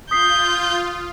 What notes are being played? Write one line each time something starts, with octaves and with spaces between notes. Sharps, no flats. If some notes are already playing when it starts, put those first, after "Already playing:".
F4 D#6 G6 B6 C7